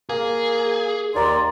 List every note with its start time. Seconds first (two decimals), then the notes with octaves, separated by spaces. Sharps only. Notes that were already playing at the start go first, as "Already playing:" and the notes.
0.09 A#3 G#4
1.15 D#2 D5 A#5 C6